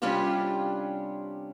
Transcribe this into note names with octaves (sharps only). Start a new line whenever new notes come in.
C3 G3 C#4 D4 F4 G4